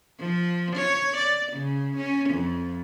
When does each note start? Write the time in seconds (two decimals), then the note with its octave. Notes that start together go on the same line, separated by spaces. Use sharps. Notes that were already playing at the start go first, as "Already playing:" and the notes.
0.20 F3
0.76 C#5
1.17 D5
1.52 C#3
1.97 C#4
2.30 F2